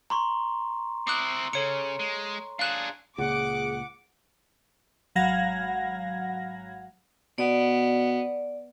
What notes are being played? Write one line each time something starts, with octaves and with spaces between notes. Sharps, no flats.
A#5 C6 C#6
C4 E4 D6 D#6 F#6
C#3 A4 C#5 C#7
G#3
D4 G#4 F5 F#6 E7
C#2 A#2 G#4 F#5 D6
G#1 F#3 F5 F#5 G#6 A#6
B2 B3 D5